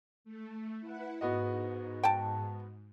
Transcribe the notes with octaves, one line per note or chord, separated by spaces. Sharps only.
A3
E4 B4 F#5
G#2 B3 F#4 D#5
G5 A5